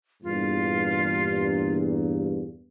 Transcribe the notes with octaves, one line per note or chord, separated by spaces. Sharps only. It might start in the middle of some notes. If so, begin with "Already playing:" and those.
E2 G2 A#2 F4